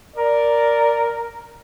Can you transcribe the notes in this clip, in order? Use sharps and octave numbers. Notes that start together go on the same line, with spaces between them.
A#4 D5